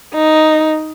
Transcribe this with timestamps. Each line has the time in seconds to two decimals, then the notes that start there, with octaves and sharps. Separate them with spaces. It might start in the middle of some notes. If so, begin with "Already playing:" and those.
0.15 D#4